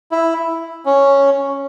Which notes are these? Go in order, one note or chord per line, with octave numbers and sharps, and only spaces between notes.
E4
C#4